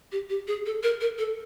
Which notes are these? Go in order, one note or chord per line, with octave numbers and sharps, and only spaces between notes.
G4
G4
G#4
A4
A#4
A#4
A4